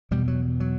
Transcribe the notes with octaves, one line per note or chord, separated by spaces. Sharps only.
E2 B2 G3
F#3
F#3